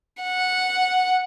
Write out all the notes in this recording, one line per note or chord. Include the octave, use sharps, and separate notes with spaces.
F#5